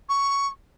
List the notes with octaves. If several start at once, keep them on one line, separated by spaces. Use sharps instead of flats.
C#6